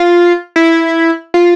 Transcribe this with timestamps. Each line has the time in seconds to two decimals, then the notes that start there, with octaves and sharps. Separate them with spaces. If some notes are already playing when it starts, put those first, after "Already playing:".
Already playing: F4
0.56 E4
1.34 F4